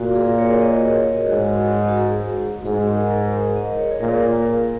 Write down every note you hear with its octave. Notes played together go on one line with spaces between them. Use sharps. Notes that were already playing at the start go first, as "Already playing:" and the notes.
Already playing: A#2 F#4
G#4
A#4
C#5
D#5
D#5
G#2 F#4
F#4
G#4
G#2 G#4
A#4
A#4
A#4
D#5
C#5
G#4
A#2 A#4